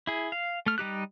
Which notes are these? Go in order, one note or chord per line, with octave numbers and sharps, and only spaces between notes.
E4 G#4
F5
A3 F6
G3 D#4 G4 F#6